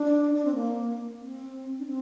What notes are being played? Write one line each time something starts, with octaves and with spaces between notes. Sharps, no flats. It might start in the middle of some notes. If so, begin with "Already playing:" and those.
Already playing: D4
D4
C4
A#3
C4
D4
C4